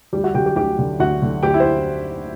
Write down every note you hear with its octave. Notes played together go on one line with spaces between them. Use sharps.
D2 G3 G4
F#4 F#5
D3 F#3 G4 G5
G4 G5
D2 G4 G5
D3 F#3
D2 F#4 F#5
D3 F#3
D2 G4 G5
E4 E5
C5